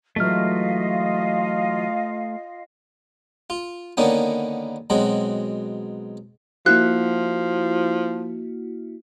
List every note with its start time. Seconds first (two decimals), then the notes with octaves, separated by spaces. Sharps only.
0.16 E3 F#3 G#3 A3 F4 D#5 F5 F6
3.50 F4
3.97 D3 D#3 A#3 B3 C#4
4.90 B2 F#3 G#3 C4
6.66 F3 A#3 E4 F#4 F#6